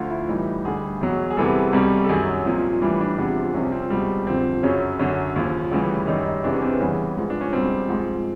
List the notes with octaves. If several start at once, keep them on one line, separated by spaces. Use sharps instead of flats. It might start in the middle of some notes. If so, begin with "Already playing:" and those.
Already playing: D2 D3 F3 F4
E4
A2 E3 G3 D#4
D2 D3 G3 G#4
E2 B2 F#3
G#4
E2 C3 E3 G3 A4
C2 B2 G3
A4
F#2 D#3 F#3 G#4
C2 A#2 F3
A2 E3 G3 D4
D4
E2 C3 F3
C2 C3 F3 C#4
C4
C#2 B2 G3
F2 D3 F3 C4
F#2 C#3 F#3 C#4
F#2 D3 F#3 C#4
D#2 C#3 F3
D2 C#3 E3 G3
F#2 D#3 G3 D#4
D#4
E2 C3 E3 D4
C#4
C4
B3
E2 C#3 E3 G3
G#2 F3
D4
C#4
C#2 B2 G3 C4
G#2 F3